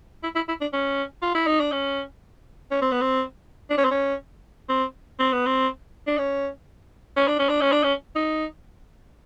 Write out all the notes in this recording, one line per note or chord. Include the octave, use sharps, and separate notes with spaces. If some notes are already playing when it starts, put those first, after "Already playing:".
E4
E4
E4
D4
C#4
F4
E4
D#4
D4
C#4
C#4
C4
B3
C4
D4
C#4
C4
C#4
C4
C4
B3
C4
D4
C#4
C#4
D4
C#4
D4
C#4
D4
C#4
D#4